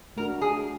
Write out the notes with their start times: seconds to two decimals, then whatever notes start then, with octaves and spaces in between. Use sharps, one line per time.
0.17 A3 D4 F#4 A#4
0.41 G#4